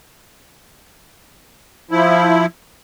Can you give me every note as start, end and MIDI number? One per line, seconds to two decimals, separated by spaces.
1.91 2.46 53
1.91 2.46 64